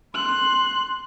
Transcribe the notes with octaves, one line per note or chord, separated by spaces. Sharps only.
C6 F#6